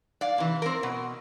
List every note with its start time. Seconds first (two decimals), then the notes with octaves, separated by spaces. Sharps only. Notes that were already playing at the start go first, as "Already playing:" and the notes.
0.21 D5 F5
0.38 C3 E3
0.62 C4 A#4
0.83 B2